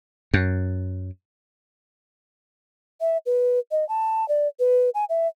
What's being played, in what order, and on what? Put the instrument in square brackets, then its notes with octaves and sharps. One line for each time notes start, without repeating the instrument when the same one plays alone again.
[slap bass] F#2
[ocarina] E5
B4
D#5
A5
D5
B4
G#5
E5